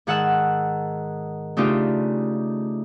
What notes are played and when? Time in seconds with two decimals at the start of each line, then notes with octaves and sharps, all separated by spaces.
0.07 G#2 D#3 G#4 F#5 A5 E6
1.57 C#3 A3 D4 D#4 F4 G4